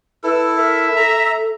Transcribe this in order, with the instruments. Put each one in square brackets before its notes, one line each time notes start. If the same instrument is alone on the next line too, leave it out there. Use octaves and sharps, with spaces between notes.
[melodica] E4 A4 [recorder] B4 [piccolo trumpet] E6
[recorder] A#4 [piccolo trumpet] E5
[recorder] A4 [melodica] A#5